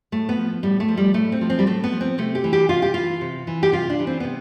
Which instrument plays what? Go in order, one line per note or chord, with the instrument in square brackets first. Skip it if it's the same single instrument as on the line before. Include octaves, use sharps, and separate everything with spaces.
[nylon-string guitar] A2 A3
B3
F3
A2 G3
A3
F3
G3
A2 A3
C4
F3
C4
G3
A2 A3
B3
F3
C4
C3 A3
G4
E3
G4
C3 F4
G4
E3 F4
C3
E3
G4
C3 F4
D4
E3
C4
C3 B3